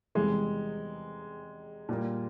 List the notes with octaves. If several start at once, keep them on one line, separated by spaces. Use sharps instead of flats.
E2 C3 E3 G3 G#3 C4
A#2 G3 A#3